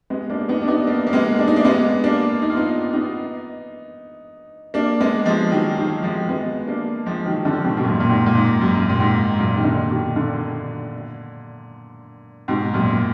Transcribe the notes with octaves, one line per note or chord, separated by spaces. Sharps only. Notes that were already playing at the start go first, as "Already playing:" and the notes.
G#3 B3
A#3 D4
B3 D#4
D4
B3 D#4
A#3 D4
A#3
G#3 B3
D4
D#4
A#3 D4
G#3 B3
A#3 D4
D#4
F4
B3 D#4
B3 D#4
A#3 D4
G#3 B3
F3 G#3
D#3 F#3
D#3 F#3
F3 G#3
G#3 B3
A#3 D4
F3 G#3
D#3 F#3
D3 F3
G#2 B2
B2
F#2 A#2
A#2
G#2
A#2
G#2
F#2
A#2
G#2
F#2 A#2
D#3
A#2 D3
B2 D#3
A#2 D3
G#2 B2
F#2 A#2